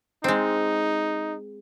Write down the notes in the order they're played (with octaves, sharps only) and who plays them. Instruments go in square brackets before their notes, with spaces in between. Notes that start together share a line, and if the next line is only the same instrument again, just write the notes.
[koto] G#3 C4 [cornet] D#4